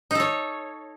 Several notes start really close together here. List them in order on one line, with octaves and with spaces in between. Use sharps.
D#4 A4 C#5